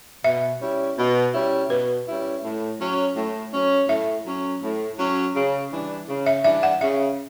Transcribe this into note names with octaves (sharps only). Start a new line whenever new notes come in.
B2 E5
G3 C#4 E4
B2
G3 C#4 E4
B2 B4
G3 C#4 E4
A2
F#3 C#4
A2
F#3 C#4
A2 E5
F#3 C#4
A2
F#3 C#4
C#3
E3 G3 D4
C#3
E5
E3 G3 D4 E5
F#5
C#3 E5